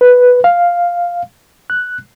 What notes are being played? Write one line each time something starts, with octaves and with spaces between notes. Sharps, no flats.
B4
F5
F#6